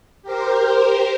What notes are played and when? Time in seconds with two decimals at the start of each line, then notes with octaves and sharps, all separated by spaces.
0.22 G4 A#4 C5